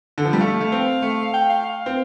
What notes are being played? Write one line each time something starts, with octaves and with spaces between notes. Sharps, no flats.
D3
F3
G3
A3 F5
A3
C4
A3
G5
F5
F5
C4